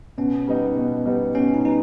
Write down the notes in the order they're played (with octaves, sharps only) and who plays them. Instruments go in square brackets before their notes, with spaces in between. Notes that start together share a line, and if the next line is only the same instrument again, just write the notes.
[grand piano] B2 [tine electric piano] C#4
[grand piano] G3 B3 D#4
B2
G3 B3 D#4
[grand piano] B2 [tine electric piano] C#4
[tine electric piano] D#4
[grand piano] G3 B3 [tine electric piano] D#4